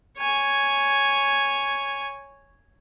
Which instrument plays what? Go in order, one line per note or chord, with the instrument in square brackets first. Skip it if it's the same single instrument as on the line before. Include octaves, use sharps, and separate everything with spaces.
[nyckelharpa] C#5 G#5